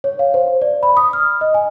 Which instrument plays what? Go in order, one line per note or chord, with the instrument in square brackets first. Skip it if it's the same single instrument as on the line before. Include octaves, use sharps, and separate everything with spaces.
[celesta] C#5
F5
C5
D5
B5
D#6
F6
D#5
G#5